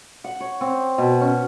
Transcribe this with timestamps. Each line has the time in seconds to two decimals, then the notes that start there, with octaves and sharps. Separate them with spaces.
0.24 F#5
0.40 C#5
0.61 C4
0.98 B2
1.21 C#4